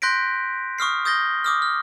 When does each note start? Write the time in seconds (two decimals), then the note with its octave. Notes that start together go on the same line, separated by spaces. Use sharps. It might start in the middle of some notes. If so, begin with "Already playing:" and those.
0.02 C6 F#6 G6 A#6 B6 D7
0.79 C#6 D#6 F6 C7
1.05 D#6 G6 A6 A#6 G7
1.44 D6 D#6 F6
1.62 F6